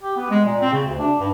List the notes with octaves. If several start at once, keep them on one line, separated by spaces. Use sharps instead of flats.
G4
B3
G#3
A#2
C4
C#3
D2
D4
G2